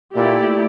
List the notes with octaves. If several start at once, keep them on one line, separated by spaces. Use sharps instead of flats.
A#2 A3 E4 G4 D5